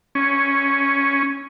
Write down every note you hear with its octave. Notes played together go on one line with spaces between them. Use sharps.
C#4